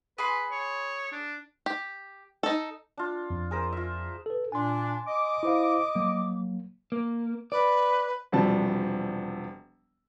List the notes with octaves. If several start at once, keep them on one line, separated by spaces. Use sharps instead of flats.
G#4 B4 B5 C6
C#5
D4
G4
D#4 A4
D4 F4
F2
G#4 A#4 C5
F4 E5
A4 B4
A#2 D4 G#5 C6
D#5 D6
E4 C5 F5
F#3 A#3
A#3
B4 D5
E1 C3 F3 G3 A5